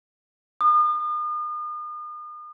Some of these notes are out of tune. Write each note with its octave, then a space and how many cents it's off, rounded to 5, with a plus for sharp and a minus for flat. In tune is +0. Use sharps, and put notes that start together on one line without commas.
D#6 -40